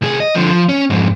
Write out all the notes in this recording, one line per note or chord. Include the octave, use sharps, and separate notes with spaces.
C2 G#4
D#5
D3 F3
F3
C#4
F2 G#2